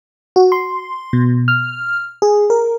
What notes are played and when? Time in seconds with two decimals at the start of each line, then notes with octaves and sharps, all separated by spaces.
0.36 F#4
0.52 C6
1.13 B2
1.48 F6
2.22 G#4
2.50 A#4